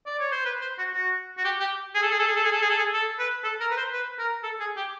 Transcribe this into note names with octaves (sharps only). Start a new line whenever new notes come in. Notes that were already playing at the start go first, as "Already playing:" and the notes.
D5
C#5
C5
B4
C5
F#4
F#4
F#4
G4
G4
G#4
A4
G#4
A4
G#4
A4
G#4
A4
G#4
A4
G#4
A4
B4
A4
A#4
B4
C5
B4
A#4
A4
G#4
G4